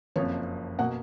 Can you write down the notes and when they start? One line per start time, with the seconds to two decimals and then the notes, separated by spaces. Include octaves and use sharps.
0.16 F#1 F2 F3 C#5
0.79 B2 A#3 F#5